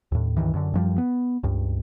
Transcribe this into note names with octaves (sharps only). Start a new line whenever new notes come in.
D#2 A2
C#2 G2 D#3 E3
F#2 D3
F#2 F3 G3
B3
C#2 G2